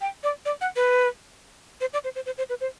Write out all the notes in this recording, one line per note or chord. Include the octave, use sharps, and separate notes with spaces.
G5
D5
D5
F#5
B4
C5
D5
C5
C5
C5
C5
B4
C5